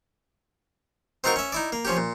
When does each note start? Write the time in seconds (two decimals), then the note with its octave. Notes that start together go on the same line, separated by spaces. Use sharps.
1.24 C4 D#4 F4 F#4 A#4
1.36 C#4 E5
1.52 D#4 E4 D5
1.72 A#3
1.85 F3 C#4 G4
1.97 A#2